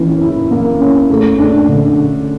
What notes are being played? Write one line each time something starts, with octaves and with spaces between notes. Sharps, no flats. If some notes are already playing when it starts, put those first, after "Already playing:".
Already playing: E3 A#3 C#4
E4
A#3
C#4
A3
D4
D3